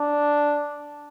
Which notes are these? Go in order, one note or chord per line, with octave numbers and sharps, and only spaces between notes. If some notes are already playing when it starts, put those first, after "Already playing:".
Already playing: D4